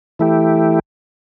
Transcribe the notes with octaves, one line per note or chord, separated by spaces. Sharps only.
E3 A3 E4 G4